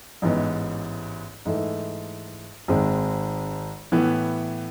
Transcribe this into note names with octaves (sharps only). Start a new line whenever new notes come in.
A1 G#2 E3 B3
G#2 E3 A3
G#1 G#2 G#3 C4
A2 E3 B3